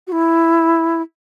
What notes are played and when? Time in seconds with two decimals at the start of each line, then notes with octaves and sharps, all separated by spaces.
0.07 F#4
0.12 E4